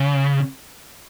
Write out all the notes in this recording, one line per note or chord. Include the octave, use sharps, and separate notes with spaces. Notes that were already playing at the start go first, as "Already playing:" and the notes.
Already playing: C#3